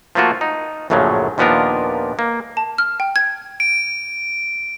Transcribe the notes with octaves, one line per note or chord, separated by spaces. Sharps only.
F3 A3 A#3 F4 F#4
D#4
A#1 F#2 A2 C#3 F3 F#3
D#2 A#2 F3 B3 D4 A#4
A#3
A5
F6
G5
G#6
D7